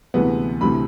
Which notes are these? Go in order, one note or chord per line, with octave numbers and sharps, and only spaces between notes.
D2 C3 E3 G#3 B3
D2 C3 E3 B5